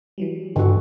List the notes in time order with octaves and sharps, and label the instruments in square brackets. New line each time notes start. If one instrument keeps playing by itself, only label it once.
[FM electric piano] E3 F#3 G3
[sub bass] G2 [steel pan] D3 F#4